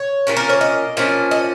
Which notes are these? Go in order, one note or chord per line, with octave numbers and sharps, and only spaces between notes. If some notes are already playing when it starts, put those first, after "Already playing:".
Already playing: C#5
A#2 A#3 C#4
A#4
C#5
D#5
A#2 F3 C#4
D#5